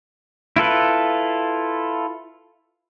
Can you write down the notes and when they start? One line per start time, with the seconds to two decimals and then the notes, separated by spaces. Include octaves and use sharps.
0.56 E4 F4 A4 B4